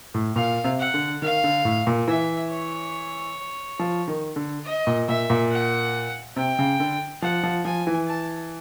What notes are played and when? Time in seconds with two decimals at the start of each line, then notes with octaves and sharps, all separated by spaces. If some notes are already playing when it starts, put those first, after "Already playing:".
0.14 A2
0.36 A#2 F5
0.64 C3
0.79 F#5
0.94 D3
1.22 D#3 F5
1.44 D3
1.65 A2
1.87 A#2
2.08 E3 E5
2.51 C#5
3.79 F3
4.08 D#3
4.36 D3
4.65 D#5
4.87 A#2
5.08 A#2 E5
5.30 A#2
5.51 F#5
6.36 C3 G5
6.59 C#3
6.80 D3
7.22 F3 F#5
7.43 F3
7.65 F3 G#5
7.87 E3
8.08 A5